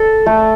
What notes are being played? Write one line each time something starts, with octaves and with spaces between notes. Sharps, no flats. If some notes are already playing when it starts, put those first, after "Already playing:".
Already playing: A4
A3